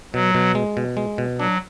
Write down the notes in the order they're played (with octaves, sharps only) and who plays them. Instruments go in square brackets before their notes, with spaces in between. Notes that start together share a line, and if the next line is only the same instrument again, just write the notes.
[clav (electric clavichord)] B2 [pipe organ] F#3
[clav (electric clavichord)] B2
G#3
B2
G#3
B2
[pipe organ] F#3 [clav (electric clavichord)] D4